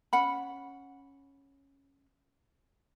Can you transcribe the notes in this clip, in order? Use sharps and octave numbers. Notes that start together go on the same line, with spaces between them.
C#4 F#5 B5